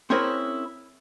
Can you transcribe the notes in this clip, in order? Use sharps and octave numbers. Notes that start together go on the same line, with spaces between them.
C4 C#4 E4 G#4 A#4 C5